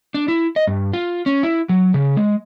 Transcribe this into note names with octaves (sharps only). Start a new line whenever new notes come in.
D4
E4
D#5
G2
F4
C#4
E4
F#3
C#3
G#3